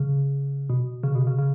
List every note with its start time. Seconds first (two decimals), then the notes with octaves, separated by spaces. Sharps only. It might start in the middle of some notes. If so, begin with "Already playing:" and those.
Already playing: C#3
0.70 B2
1.03 C#3
1.15 B2
1.27 C#3
1.39 C#3